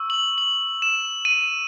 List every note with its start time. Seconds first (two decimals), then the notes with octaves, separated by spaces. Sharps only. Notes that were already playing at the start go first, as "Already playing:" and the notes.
Already playing: C#6 E6
0.10 F#7
0.38 F#7
0.82 E7
1.25 D#7